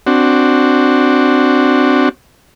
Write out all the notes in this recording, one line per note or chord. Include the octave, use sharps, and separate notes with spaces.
C4 D4 F#4